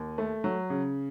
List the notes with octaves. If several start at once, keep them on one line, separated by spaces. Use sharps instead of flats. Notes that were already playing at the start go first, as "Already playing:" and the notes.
Already playing: D#2
A3
F#3
C#3